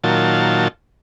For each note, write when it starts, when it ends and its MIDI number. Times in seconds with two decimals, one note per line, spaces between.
0.04 0.68 46
0.04 0.68 51
0.04 0.68 54
0.04 0.68 65
0.04 0.68 81